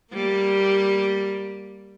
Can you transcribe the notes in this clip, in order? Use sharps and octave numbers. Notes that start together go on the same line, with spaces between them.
G3 A#3